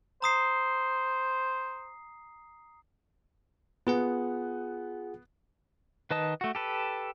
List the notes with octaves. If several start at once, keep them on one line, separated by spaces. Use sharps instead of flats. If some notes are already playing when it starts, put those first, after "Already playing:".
C5 A#5 D#6 C7
B3 F4 G#4 F#5
D#3 B4 D#5 A5 D#6
A3 F#4
G4 A4 B4